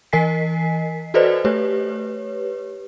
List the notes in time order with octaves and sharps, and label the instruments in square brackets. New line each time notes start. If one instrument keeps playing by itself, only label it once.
[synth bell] E3 A#4 D#5 G#5 B6 C7
F#4 A4 B4 C5 D5 D#5
A3 G4 B4 C#5